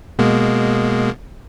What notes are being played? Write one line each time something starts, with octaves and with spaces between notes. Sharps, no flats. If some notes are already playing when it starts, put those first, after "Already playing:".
B2 G#3 A#3